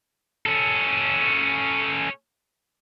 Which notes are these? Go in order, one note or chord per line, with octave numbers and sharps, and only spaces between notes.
C#4 A4